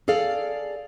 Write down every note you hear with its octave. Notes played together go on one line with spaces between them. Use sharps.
G#4 A4 D5 F5